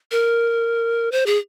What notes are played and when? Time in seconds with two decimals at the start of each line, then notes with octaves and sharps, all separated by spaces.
0.11 A#4
1.12 C5
1.26 G#4